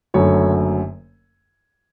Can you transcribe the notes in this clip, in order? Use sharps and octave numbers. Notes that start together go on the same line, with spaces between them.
F#1 F#2 D3 F#3 A3 C#5